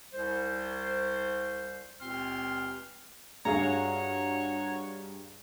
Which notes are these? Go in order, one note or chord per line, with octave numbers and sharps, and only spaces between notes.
C2 C5
C#2 A#2 C4 G4 C6 F6
G2 F#4 G#4 C#5 F5 A#5